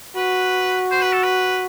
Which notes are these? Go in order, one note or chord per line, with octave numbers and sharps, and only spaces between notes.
F#4 B4
C5
B4
A4
B4